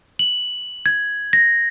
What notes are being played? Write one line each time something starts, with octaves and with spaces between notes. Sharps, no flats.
F#7
G#6
A#6